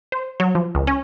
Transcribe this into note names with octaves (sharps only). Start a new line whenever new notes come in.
C5
F#3
F3
C#2
C#4